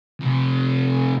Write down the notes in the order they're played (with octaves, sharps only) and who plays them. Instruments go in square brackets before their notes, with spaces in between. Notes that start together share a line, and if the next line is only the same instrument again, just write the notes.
[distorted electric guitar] F2 C3